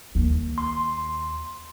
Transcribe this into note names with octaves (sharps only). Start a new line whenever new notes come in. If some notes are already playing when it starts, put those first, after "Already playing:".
D#2
C6